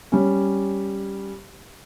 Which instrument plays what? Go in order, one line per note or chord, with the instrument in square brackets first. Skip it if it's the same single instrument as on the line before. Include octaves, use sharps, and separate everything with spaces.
[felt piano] G3 C#4